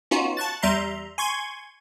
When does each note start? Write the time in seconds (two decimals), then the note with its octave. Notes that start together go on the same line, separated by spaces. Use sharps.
0.11 B3 C#4 D#4 F4 F#4
0.37 A5 C#6 F#6 A6
0.62 E2 G3 E5 A#5 C6
1.18 G#5 C6 C#6 G#6